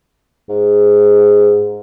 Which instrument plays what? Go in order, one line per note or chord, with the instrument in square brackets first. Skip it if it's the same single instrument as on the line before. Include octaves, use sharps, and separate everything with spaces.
[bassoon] G#2